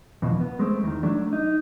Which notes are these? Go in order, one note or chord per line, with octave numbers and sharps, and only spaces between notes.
E2 B2 D3 F3
B3
G#3 A3 C4
E2 D#3
F#3 A3 D4
D#4